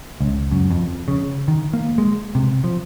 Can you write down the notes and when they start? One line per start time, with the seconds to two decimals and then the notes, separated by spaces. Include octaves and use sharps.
0.21 C#2
0.51 F#2
0.71 F2
1.08 C#3
1.48 D#3
1.73 A#3
1.98 G#3
2.35 C3
2.64 F3